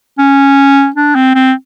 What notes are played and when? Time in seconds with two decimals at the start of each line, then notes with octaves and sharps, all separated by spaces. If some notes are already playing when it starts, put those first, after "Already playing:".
0.19 C#4
0.96 D4
1.15 C4
1.35 C4